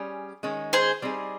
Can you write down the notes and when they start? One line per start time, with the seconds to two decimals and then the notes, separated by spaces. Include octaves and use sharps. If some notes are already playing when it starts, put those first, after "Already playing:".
Already playing: G3 C#4 G#4
0.43 D#3 G#3 C#4
0.73 G#4 C5
1.02 G3 C4 D#4 G#4